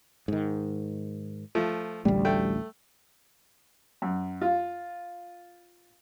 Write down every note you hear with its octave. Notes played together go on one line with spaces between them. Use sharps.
G#2 D#3
F3 A3
A1 D2 G3
A3 G5
F#2
F4